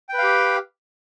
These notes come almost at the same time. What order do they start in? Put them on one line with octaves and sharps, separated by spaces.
G5 B4 F5 G4